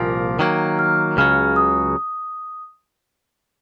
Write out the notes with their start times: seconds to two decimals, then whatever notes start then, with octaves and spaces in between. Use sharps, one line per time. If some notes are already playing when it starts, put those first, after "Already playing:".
Already playing: C2 A#2 F3 A#3
0.39 D#3 F#3 A#3
0.79 F6
1.17 C#2 C#3 F#3 F6
1.56 D#6